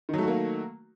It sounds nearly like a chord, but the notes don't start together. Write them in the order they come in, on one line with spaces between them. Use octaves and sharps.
D#3 F#3 A3 F#4 A#3